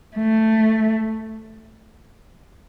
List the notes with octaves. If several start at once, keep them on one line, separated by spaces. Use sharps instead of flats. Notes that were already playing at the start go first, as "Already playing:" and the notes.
A3